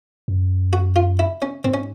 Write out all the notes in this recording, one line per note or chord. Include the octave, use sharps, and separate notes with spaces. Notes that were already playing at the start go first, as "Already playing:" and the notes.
F#2
F#4
F4
E4
C#4
G#2 C4
C#4